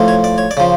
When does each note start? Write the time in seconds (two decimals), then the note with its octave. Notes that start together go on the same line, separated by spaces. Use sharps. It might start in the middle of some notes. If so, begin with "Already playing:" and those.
Already playing: A2 F3
0.08 C#5
0.24 D5
0.38 C#5
0.51 D5
0.57 C#3 F3